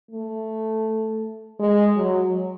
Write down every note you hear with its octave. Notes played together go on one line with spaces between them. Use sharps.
A3
G#3
F#3